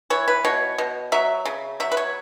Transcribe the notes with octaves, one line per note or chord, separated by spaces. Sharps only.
E3 C#5
B4
B2 C#5
B2
F#3 E5
C#3
F#3 E5
B4
C#5